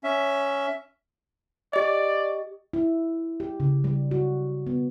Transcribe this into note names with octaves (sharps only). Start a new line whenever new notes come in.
C#4 E5
G4 D5 D#5
E4
G4
C#3
G3
F#4
B3